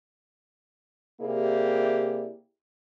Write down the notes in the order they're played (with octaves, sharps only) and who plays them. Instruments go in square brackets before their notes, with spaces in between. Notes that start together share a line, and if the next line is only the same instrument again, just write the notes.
[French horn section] C3 A#3 E4 G4 G#4 D5